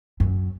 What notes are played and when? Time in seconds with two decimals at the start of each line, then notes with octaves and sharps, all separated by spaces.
0.20 F#2